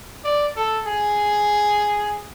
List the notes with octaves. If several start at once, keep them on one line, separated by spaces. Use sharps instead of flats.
D5
A4
G#4